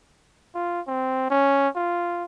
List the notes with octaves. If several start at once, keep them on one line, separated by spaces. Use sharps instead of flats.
F4
C4
C#4
F4